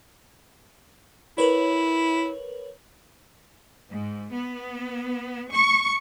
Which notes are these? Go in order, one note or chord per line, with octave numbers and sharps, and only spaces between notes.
E4 A#4 B4 C#5
G#2
B3
C#6